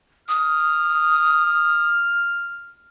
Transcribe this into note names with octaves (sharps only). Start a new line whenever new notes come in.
D#6 F6